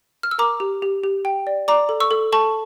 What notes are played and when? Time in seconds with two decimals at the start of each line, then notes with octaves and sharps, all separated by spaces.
0.23 F6
0.31 E6
0.38 A#4 A#5 D6
0.60 G4
0.82 G4
1.04 G4
1.25 G5
1.47 D5
1.68 D5 A#5 D6
1.89 A4
2.00 C#6 E6
2.11 A4
2.32 A4 A5 C#6